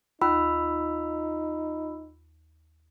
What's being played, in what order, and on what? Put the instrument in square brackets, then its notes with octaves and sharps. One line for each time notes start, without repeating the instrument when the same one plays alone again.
[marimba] D#2 [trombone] D#4 [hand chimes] F4 B5 E6